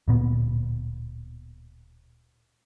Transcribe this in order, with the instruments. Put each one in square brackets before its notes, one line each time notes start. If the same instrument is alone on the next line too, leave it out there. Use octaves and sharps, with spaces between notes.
[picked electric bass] D1 A#2 B3